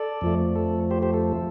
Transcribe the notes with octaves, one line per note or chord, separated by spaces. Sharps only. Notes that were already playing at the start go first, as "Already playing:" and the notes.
Already playing: A4 D5
F2 F3 A3
A4
G4 C5
G4 C5
A4